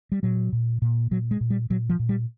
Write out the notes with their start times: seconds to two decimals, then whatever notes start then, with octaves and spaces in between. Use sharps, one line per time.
0.12 G3
0.23 A#2 F#3
0.53 A#2
0.82 A#2
1.11 A#2 F#3
1.31 G#3
1.41 A#2
1.50 G3
1.70 A#2 F#3
1.90 F3
1.99 A#2
2.09 G3